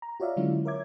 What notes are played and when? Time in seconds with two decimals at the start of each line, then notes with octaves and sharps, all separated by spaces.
0.02 A#5
0.20 F4 F#4 C#5 D5 E5 F5
0.37 D3 F#3 G#3 C#4 E4 F4
0.65 A#4 C#5 E5 D6 G#6